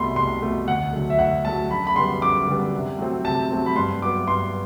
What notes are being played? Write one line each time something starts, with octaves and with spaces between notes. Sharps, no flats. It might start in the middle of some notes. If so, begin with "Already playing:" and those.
Already playing: C2 B2 A3 B5 C6
C2 C6
B2 A3
D2 F#5
D3 F#3 A3
E5
D2 F#5
D3 F#3 A3 A5
F#2 B5
B5
D3 G3 B3 C6
F#2 D6
D3 G3 B3
C3
F#3 A3 C4
C3 A5
F#3 A3 C4
B5
G2 C6
F#3 B3 D6
G2 C6